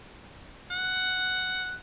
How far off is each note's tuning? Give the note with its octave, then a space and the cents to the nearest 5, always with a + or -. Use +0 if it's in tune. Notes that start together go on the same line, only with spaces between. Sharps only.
F#5 +5